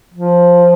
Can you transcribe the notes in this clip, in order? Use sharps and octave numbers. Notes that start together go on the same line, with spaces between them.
F3